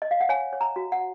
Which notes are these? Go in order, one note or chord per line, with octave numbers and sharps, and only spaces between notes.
D#5
F5
F#5
C#5 G#5
C#5
A#5
F#4
F#5